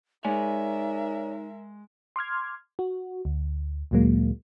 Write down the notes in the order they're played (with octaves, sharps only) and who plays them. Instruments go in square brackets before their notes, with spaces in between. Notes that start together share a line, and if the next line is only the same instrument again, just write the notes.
[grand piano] G#3 [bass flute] D#4 [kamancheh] A#4 E5 [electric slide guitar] C#5 D5 G#5
[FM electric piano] C6 D6 F6 G#6
F#4
D2
D2 A#2 F#3 G#3 A#3